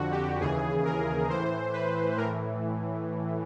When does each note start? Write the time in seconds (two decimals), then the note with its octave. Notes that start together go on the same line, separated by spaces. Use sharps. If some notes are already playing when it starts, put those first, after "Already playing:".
Already playing: F2 D3 F#4
0.12 G4
0.40 D#2 C#3 E3 G#4
0.85 A#4
1.29 A2 E3 C5
1.73 B4
2.17 A2 E3 A#4